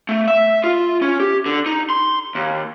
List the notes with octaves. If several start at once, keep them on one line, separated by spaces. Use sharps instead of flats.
A3
E5
F4
C#4
G4
D3
D#4
C6
D#2